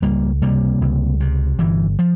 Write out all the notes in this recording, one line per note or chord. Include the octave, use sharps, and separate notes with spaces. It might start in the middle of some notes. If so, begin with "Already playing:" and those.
C#2 G3 A#3
C3 G3 A#3
C#2
C3
G1 E3
F3